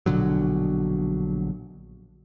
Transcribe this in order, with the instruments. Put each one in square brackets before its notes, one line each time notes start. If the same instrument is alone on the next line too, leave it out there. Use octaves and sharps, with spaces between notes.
[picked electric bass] A#1 B2 D3 F#3